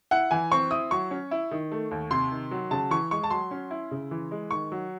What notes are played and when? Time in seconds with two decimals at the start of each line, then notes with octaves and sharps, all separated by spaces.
0.11 E4 F#5
0.31 E3 G#5
0.51 C4 C#6
0.71 E4 D#6
0.91 F#3 C#6
1.11 C#4
1.31 E4
1.51 D#3
1.72 A3
1.91 D#2
2.10 C3 C6
2.32 D#3
2.51 F#3
2.71 C#3 A5
2.91 E3 C#6
3.11 G#3 C#6
3.23 A5
3.30 F#3 C6
3.51 C#4
3.71 E4
3.91 C#3
4.11 E3
4.31 G#3
4.51 D#3 C#6
4.72 F#3